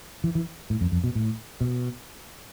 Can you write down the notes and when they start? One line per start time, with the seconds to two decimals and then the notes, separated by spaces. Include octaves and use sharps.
0.24 E3
0.35 E3
0.70 A2
0.81 F2
0.92 F2
1.04 B2
1.15 A2
1.61 B2